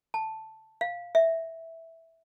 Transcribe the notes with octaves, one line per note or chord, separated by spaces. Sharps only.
A5
F5
E5